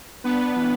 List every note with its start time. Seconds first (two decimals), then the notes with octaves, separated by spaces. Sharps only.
0.24 B3 D4 B4
0.56 E3